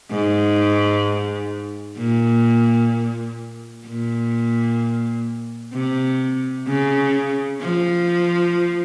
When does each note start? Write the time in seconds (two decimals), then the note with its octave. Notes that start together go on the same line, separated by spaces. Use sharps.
0.11 G#2
1.98 A#2
3.86 A#2
5.73 C3
6.67 C#3
7.61 F3